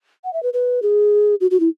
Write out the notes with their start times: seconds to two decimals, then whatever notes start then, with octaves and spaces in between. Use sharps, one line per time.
0.24 F#5
0.33 E5
0.43 B4
0.53 B4
0.82 G#4
1.41 F#4
1.51 F#4
1.60 E4